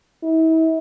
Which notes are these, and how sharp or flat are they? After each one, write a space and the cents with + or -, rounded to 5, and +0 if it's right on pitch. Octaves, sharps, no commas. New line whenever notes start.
E4 -40